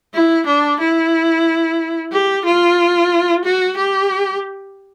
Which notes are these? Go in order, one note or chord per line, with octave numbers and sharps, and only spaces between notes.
E4
D4
E4
G4
F4
F#4
G4